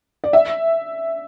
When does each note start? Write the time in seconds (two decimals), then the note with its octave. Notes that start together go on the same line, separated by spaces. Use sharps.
0.24 D5
0.33 E5